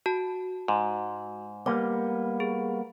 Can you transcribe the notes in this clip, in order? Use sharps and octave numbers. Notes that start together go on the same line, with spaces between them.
F#4 A5
G#2
G3 A#3 B3 D6
G#4